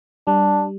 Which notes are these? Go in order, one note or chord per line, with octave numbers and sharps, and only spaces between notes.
G3 D4